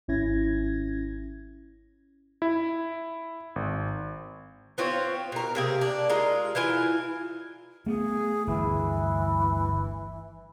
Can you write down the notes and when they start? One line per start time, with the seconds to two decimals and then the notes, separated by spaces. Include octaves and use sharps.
0.08 G#1 C#4 E4 G#6 A#6
2.42 E4
3.56 G#1
4.78 B3 C4 F4 C#5
5.32 B2 A#4
5.55 C3 A#3 G#4
5.81 D4
6.09 G#3 F4 A#4
6.55 E3 E4 F4 G#5
7.86 A3 B3 G#4
8.47 G1 D2 E3